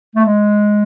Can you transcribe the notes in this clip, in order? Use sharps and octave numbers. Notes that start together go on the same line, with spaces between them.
A3
G#3